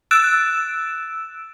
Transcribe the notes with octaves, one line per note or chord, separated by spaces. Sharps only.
E6 F#6 A6 D7 E7